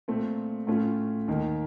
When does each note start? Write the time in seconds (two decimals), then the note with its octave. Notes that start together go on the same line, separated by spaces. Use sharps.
0.08 A#2 A3 C4
0.67 A2 A3 C#4 F4
1.28 D#2 D#3 A#3